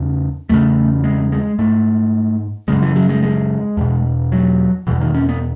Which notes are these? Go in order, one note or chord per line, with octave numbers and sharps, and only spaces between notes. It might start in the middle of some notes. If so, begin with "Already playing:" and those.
Already playing: E2 C#3
E2 C#3 A3
G#3
G#3
G#2 A3
F#2 C#3 G#3
E3
F#3
G#3
G#3
E2 B2
F#3
E2 B2 E3
D#3
C#4
B3